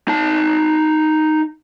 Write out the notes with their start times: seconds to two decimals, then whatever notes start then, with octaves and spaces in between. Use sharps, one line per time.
0.08 D#4 A5